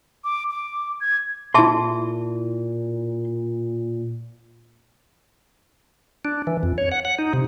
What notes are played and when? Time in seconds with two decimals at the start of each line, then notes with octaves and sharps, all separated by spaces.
0.24 D6
0.51 D6
1.01 G#6
1.54 A#2 E4 G#4 E5 A5 C6
6.25 D4
6.47 E3
6.63 F2
6.78 C#5
6.92 F#5
7.05 F#5
7.19 D#4
7.33 C3